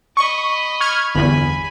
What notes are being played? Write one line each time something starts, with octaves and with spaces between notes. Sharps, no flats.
D#5 B5 C#6
C#6 F6 G#6
G1 E2 G#5 B5